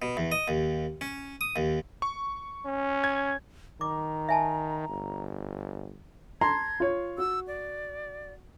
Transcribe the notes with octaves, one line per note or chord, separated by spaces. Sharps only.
B2
E2
D#5
D#2
C#4
D#6
D#2
C#6
C#4
G#6
D#3 A#5 D6
E5 G#5 A5
G1
A5 A#5 C6 G#6
F4 C#5
F#4 E6
D5